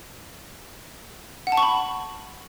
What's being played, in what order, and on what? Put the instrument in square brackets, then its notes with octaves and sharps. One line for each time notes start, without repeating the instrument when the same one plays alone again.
[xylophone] F#5
A5
C#6
B5